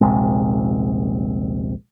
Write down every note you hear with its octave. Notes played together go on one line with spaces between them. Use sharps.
D#1 A#1 C3 G#3